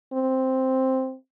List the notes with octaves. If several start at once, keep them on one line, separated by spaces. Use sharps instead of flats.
C4